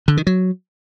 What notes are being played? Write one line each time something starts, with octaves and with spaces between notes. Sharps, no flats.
D3
D#3
F#3